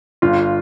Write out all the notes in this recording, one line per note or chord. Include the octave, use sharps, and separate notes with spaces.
G1 F4